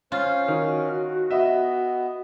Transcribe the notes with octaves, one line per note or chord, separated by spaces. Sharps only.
C#4 F4 C5
D#3 F#4
B3 D#5 E5